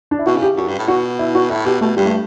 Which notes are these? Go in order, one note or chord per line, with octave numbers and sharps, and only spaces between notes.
D4
E4
B2 F#4
C#3
G4
F#2 F#4
G2
A2
B2 F#4
E4
F#4
A2 E4
B2 G4
B2 A3
G2 G3
A3